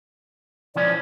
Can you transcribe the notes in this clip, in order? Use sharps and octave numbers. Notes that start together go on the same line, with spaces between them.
E3 F3 C#4 D5